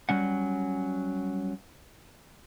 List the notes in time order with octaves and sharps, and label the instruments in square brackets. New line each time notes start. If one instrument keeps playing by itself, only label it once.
[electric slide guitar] F#3 G3 C#4 F#5